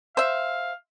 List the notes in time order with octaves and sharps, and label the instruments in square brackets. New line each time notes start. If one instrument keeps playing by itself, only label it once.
[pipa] C5 E5 [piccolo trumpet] F5